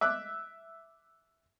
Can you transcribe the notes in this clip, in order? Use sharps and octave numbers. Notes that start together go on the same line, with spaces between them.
E5 D6 F#6